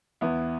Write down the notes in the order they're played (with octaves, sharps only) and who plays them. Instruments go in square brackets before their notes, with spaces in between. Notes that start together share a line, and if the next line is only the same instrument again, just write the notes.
[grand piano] E2 B3 E4